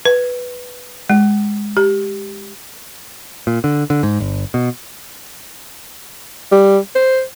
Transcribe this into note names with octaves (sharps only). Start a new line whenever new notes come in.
B4
G#3
G4
A#2
D3
D3
G#2
G1
B2
G3
C5